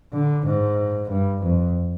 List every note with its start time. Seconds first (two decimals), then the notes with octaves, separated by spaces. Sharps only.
0.13 D3
0.46 G#2
1.09 G2
1.42 F2